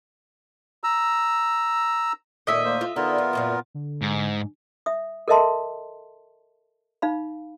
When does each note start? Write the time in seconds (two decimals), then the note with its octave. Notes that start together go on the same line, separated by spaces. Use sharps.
0.84 A#5 E6
2.47 D#2 A#2 A3 D#5 E5
2.65 A#3 C5
2.81 F4
2.96 D3 B3 D#4 F4 A#4
3.18 F2
3.33 F#2 A#2 F3
3.74 D3
4.02 G#2
4.86 E5 D#6
5.28 A4 A#4 D#5 E5 A5 C6
7.02 D#4 F5 B5